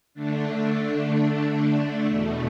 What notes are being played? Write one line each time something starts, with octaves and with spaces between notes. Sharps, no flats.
D3 A3 D4
E2 B2 A3